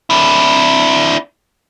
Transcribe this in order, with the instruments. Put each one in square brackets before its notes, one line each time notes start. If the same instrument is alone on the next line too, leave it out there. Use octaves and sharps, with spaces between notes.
[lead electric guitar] D4 E4